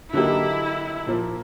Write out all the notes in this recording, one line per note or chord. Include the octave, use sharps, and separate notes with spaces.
D3 F#3 A#3 D#4 E4 G4
A#2 F3 A#3